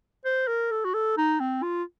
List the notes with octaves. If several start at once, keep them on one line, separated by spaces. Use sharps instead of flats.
C5
A#4
A4
F#4
A4
D#4
C4
F4